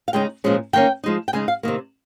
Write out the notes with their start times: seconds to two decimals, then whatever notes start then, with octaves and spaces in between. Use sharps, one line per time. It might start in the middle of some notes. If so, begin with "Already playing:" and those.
0.08 F5
0.13 C#3 G#3 D#4 G5
0.44 A#2 F3 G#3 C#4
0.73 D#3 A#3 C#4 G5
1.04 F3 G#3 D#4
1.28 G5
1.33 C#3 G#3 D#4 G#5
1.48 F5
1.63 C3 D#3 A#3